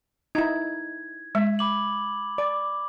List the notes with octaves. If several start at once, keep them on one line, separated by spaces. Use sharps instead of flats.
D#4 E4 G#6
G#3 E5
B5 D6 F#7
D5 D6